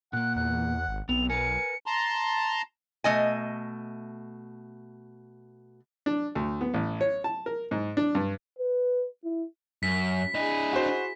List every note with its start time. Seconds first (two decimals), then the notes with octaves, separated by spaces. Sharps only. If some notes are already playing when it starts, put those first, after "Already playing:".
0.13 A#2 A#3 F#5 F#6
0.36 E2 F#6
0.88 G#1
1.09 B1 B3 C4 F7
1.30 A#4 B4 G#5 C#7
1.86 A5 A#5 C6
3.04 B2 A3 D#5 G#5
6.06 D4
6.35 D2
6.61 B3
6.74 A1
7.01 C#5
7.24 A5
7.46 A#4
7.71 G#2
7.97 D4
8.15 G2
8.59 B4
9.24 E4
9.83 F#2 B6
10.35 D4 E4 G#4 D#5
10.73 F#4 C5